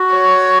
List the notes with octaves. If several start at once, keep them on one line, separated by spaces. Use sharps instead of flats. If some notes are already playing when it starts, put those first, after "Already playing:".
Already playing: F#4
C#5